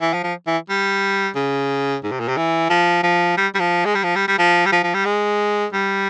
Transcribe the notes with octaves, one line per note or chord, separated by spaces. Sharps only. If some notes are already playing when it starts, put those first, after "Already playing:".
E3
F3
F3
E3
G3
C#3
G#2
C3
A#2
C3
E3
F3
F3
G3
G3
F3
G#3
G3
F3
G3
G3
F3
G3
F3
F3
G3
G#3
G3